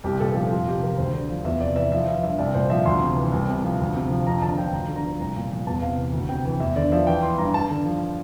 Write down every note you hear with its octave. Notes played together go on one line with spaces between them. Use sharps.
C2 G4
A#2 A4
A4
F3 G4
F2 F4
C3 G4
F3 A#4
D2 C5
D3
F3
E2 E5
C3 D5
E3 E5
F3 E5
F3 E5
G2 E5
C2 D5
A#2 C5
F3 E5
D2 C6
C3
E3
C2
C3
F3
D2
C3
F3
F2 A#5
D3 A5
F3 G5
D2 A#5
D3
A#5
F3
C2 A#5
A#2
F3
E2 A5
C3 F5
E3
D2
C3 G5
E3 G5
E2 E5
D3 D5
F3 E5
E3 G5
E3 C6
G2 A#5
G2 A5
D3
F3